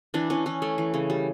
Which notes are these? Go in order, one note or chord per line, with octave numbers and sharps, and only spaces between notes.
E3 D4
E3 C#4
E3 C#4
A3
E3
C#3
G3